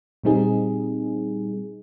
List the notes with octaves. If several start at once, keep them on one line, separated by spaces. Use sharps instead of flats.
A#2 G3 C4 D#4 G#4